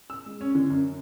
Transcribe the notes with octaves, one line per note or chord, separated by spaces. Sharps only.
E6
G#3
C#4
D3
F#2